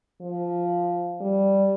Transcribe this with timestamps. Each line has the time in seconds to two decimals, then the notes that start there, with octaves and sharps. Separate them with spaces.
0.21 F3
1.21 G3